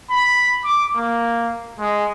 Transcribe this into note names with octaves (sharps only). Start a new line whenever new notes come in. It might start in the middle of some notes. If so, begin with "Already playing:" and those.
B5
D6
A#3
G#3